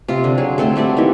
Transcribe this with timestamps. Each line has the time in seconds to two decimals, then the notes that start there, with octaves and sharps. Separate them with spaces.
0.08 C3 F4
0.24 D3
0.38 F#3 G#4
0.58 A3 C4 A4
0.76 G3 A3 F#4 D5
0.96 D#3 E3 A#3 G4